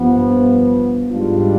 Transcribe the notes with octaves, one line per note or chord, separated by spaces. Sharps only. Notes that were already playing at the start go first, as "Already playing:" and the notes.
Already playing: G2 F3 B3
G#2 G3 D4 F4